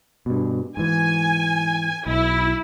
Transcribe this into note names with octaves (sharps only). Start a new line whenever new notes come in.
G2 B2
G#2 E3 G#5
B1 E4